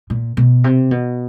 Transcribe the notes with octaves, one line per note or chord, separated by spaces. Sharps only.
A#2
B2
C3
B2